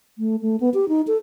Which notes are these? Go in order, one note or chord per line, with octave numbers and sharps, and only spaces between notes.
A3
A3
B3
G4
D#4
A4